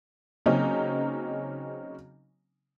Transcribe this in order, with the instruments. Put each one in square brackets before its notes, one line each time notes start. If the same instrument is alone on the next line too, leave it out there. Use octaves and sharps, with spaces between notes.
[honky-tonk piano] C#3 F#3 A#3 C4 C#4 D#4